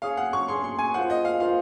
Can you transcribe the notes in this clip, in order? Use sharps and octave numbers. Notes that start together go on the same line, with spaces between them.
C#4 G#4 C#5 F5
F#5
C#6
C#4 G#4 C#5 C6
C6
G#5
A#3 F4 C5 F#5
D#5
F5
A#3 F4 C5 F5